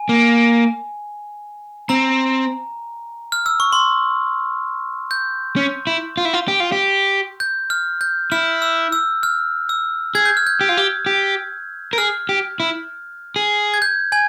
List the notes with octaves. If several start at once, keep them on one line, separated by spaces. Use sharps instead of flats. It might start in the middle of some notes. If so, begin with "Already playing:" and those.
Already playing: G#5
A#3
C4 A#5
F6
E6
C#6
C6
G6
C#4
E4
F4
E4
F4
G4
F4
G4
G6
F6
G6
E4 F6
E6
E6
F6
E6
G#4 G#6
G6
F6
G6
G4
F4
G4
G4
A#4
G#4 F6
G4
E4
G#4
G#6
G6
G#5 G#6